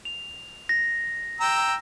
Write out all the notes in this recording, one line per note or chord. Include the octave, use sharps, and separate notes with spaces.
F7
A#6
G5 A#5 E6